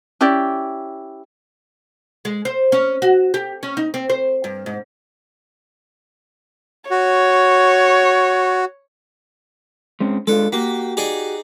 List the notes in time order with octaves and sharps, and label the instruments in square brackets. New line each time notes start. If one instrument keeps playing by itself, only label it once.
[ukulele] C#4 E4 G4 D5
[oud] G#3
C5
C#4
F#4
G4
C#4
D#4
C4
C5
G2
G#2
[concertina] F#4 [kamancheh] C#5
[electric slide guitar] G#3 C4 C#4
[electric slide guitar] G#3 D4 F4 [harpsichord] A4
[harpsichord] A#3 [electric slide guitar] F#4 G4
[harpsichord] D#4 G#4 D5